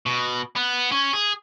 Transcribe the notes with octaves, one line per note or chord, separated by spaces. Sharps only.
B2
B3
C#4
G#4